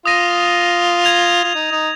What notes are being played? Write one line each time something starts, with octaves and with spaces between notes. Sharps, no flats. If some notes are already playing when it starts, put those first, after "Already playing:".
F4 D#6 A#6 D#7
G#6 F7
F4
D#4
D#4